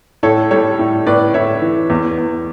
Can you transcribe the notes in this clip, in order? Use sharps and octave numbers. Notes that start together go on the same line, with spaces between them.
A2 A4 C#5
G3 A4 C#5
A2
A2 B4 D5
A2 C#5 E5
E3
E2
E2